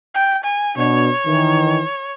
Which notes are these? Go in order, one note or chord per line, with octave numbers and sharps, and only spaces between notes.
G5
G#5
B2 D4 C#5
D#3 E3